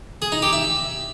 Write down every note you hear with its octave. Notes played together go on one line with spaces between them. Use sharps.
G#4
D#4
G4
E5